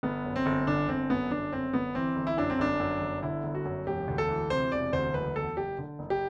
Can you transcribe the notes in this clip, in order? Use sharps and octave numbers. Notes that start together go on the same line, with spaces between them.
G1 B3
F#2
C4
G1
D3 D4
G1 C4
F#2 B3
G1 D4
F#2 C4
G1 B3
E3 C4
G1
E4
F#2 D4
C4
G1 D4
F#2
G1
D3 E4
G1
F#4
F#2
E1 G4
D2
A4
E3
C3 C5
E1 D5
D2 C5
F#1 B4
E2 A4
F#1 G4
D3
F#1
G4